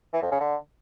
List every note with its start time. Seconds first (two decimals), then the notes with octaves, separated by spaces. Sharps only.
0.13 E3
0.22 F2
0.31 C#3
0.40 D3